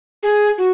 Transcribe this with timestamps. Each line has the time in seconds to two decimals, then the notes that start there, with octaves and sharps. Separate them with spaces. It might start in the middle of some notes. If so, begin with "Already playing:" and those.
0.23 G#4
0.58 F#4